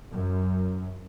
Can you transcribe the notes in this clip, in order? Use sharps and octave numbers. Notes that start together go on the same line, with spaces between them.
F#2